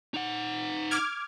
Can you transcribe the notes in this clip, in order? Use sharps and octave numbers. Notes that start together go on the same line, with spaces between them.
D#4 F#5
D6 F6 G#6